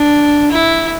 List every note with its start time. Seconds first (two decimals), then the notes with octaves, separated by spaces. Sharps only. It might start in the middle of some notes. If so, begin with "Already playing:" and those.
Already playing: D4
0.51 E4